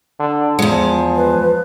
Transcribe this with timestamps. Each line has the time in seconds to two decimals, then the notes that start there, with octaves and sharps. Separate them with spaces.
0.20 D3
0.59 E2 F3 G#3
1.16 B4